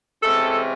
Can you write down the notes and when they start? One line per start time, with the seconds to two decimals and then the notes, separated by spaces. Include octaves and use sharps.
0.22 C3 E3 G#3 C#4 A4